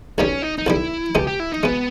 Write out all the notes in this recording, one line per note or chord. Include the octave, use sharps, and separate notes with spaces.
B1 B2 G3 C#4
D#4
D#4
B1 B2 G3 E4
C#2 B2 G#3 G4
G4
E4
D#4
B2 G#3 B3